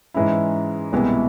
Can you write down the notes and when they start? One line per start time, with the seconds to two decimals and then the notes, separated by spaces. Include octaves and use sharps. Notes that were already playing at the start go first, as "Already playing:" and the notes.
0.14 G#2 E3 G#3 C#4 E4
0.92 C2 B2 G#3 B3 E4